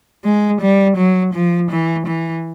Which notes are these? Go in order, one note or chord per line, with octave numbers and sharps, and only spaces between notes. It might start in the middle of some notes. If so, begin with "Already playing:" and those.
G#3
G3
F#3
F3
E3
E3